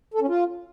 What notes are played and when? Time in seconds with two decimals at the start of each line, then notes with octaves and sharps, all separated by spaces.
0.14 A4
0.21 C#4
0.28 F4